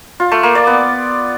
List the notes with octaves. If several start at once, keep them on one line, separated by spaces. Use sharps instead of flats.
F4
A3
A#3
D5
B3